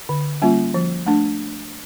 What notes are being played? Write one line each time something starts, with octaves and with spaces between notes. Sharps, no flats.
D3
G3 A#3 C#4 F4
F3
A3 D4